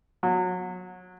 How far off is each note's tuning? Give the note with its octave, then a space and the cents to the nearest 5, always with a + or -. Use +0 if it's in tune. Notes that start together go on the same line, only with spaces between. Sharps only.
F#3 -25